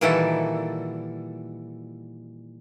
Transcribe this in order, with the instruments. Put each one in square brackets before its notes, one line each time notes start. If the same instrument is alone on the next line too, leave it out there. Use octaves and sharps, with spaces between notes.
[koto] A#2 D#3 E3 G3 F#4 A4